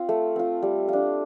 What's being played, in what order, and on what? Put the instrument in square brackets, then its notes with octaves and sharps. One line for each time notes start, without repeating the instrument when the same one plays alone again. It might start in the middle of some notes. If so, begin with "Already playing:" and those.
Already playing: [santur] C4 F4
A3
C4 F4
G3
D4 F4